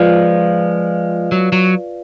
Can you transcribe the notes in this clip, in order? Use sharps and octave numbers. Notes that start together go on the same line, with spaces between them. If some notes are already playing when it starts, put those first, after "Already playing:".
Already playing: F3 G#3 F4 B4 D5 F5
F#3
F#3